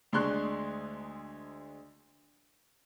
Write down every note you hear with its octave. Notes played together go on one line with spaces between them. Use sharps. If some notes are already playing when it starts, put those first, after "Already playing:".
D2 G#3 D4 C6 C#6 F#6